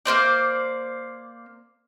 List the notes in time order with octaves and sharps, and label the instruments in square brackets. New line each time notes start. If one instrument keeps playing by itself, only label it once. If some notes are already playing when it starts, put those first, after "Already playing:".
[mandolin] A#3 C#4 C5 D5